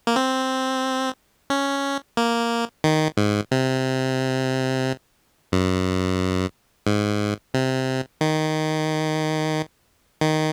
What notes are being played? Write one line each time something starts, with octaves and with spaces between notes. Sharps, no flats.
A#3
C4
C#4
A#3
D#3
G#2
C3
F#2
G#2
C3
D#3
D#3